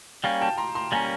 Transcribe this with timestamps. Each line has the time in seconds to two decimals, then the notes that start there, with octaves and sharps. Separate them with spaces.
0.24 G3 A#3 C#4 F5 G5
0.41 G5 A5
0.58 A#5 C6
0.75 A#5 C6
0.92 G3 A#3 C#4 G#5 A#5